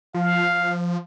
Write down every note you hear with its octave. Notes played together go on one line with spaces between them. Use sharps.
F3 F5